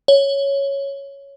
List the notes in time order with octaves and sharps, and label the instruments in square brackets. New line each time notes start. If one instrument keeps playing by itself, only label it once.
[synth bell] C#5